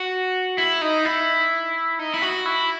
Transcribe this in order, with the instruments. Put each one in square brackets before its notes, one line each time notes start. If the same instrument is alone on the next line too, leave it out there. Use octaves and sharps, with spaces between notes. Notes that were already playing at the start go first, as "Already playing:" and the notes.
Already playing: [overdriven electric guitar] F#4
E4
D#4
E4
D#4
E4
F#4
E4